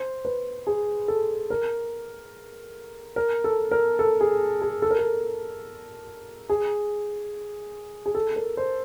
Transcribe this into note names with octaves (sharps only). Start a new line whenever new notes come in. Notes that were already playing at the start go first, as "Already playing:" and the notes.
Already playing: C5
B4
G#4
A4
A#4
A#4
A4
A#4
A4
G#4
G#4
A4
A#4
A4
G#4
G#4
A4
A#4
C5